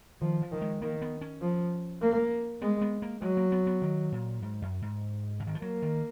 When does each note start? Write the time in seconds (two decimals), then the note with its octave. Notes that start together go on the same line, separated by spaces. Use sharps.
0.21 D#3 F3
0.42 F3
0.52 D#3
0.61 G#3
0.82 D#3 A#3
1.02 B3
1.21 C#4
1.41 F3
2.02 A#3
2.62 G#3 B3
2.81 B3
3.02 A#3
3.22 F#3 G#3
3.37 A#3
3.52 B3
3.67 B3
3.82 D#3
4.12 A#2
4.42 G#2
4.62 F#2
4.82 G#2
5.40 C#3
5.47 D#3
5.55 F3
5.62 F#3 A#3
5.82 D#3